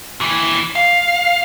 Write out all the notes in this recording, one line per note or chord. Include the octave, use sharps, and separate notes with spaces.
D#2 E3
F5